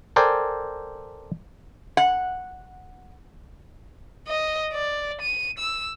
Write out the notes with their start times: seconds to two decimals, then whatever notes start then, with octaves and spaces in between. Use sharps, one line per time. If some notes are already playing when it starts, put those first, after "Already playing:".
0.16 A4 A#4 C5 D5 G5 G#5
1.97 F#5
4.28 D#5
4.73 D5
5.21 D#7
5.58 E6